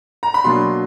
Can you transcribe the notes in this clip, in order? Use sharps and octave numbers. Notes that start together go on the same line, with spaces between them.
A#5
B5
B2 F#3 A#3 D4 C6